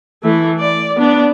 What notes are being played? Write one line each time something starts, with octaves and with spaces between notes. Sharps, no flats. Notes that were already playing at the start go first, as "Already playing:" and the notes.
E3 A3
D5
B3 D4